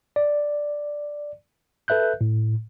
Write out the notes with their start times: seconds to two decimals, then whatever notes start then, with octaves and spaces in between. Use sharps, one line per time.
0.16 D5
1.88 A4 B4 E5 F#6 G6
2.21 A2